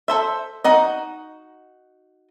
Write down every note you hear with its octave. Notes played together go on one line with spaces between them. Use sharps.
A4 C5 E5
D#4 F#4 D#5